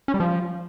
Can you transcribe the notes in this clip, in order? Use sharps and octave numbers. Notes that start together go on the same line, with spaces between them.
C#4
G3
F3